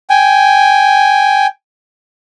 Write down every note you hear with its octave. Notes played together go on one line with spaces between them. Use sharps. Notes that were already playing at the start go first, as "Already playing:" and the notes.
G5 G#5